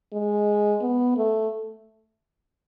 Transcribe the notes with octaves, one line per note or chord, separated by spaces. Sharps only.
G#3
B3
A3